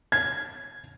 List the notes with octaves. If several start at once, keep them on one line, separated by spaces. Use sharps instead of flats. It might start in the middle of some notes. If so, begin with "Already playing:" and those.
G#6